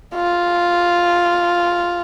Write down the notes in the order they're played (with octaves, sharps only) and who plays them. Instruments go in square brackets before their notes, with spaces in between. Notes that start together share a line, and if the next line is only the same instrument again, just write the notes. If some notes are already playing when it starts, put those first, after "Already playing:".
[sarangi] F4